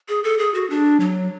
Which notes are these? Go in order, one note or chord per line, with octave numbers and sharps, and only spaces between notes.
G#4
A4
G#4
F#4
D4
F#3